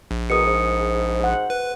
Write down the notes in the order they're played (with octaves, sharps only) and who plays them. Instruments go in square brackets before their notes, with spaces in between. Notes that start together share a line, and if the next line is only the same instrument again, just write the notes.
[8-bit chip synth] A#1
[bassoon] B2 [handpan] G#4 A#4 [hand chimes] D#6 C#7
[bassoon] G#2
[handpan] C5 F#5
[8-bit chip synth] B4